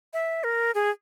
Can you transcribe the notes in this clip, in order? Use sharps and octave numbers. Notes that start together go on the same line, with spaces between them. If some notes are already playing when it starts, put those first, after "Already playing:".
E5
A#4
G#4